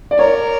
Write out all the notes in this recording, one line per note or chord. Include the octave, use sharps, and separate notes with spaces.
D5
A#4 C#5